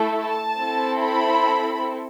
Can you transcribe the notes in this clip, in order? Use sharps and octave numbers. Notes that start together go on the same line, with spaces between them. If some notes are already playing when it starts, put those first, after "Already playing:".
Already playing: A3 E4 A4
A5
C4 E4 A4
B5